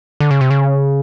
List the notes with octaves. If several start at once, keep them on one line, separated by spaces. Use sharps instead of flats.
D3
C#3
C3
C#3